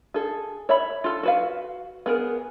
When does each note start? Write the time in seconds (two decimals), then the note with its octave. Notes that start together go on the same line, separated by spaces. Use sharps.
0.14 G#4 A4
0.69 C#5 E5 B5
1.04 F4 A4
1.23 F#4 B4 F5
2.06 B3 G#4 A#4